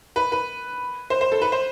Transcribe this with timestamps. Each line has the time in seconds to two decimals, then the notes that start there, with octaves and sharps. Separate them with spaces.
0.16 B4
0.32 B4
1.10 C5
1.21 C5
1.32 A4
1.42 B4
1.52 C5